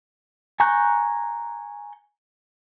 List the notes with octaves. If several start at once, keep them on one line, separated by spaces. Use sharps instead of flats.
G#5 A#5 C#6 F#6 G6